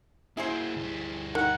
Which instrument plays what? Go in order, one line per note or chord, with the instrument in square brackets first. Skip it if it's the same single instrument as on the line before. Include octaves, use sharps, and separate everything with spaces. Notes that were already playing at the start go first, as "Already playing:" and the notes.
[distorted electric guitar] A#3 F#4 [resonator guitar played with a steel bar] E4 G#4 C5
[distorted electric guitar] D2 G3
[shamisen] D#3 [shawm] F#5